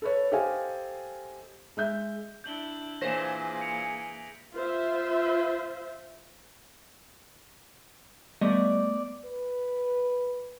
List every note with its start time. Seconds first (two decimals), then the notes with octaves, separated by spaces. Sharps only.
0.02 A4 B4 C#5
0.32 G4 A4 C5 D#5 F5 G#5
1.77 G#3 E5 G6
2.44 D4 E4 G6 F#7 G7
3.01 A#2 E3 A#3 G#4 C5 A#6 B6
3.61 C#7 D7 F7
4.56 F4 C5 E5
8.41 G3 A3 B3 D5 D#5
9.25 B4